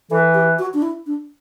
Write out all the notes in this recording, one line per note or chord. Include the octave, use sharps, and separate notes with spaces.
E3 A4
G4
F#4
D4
E4
D4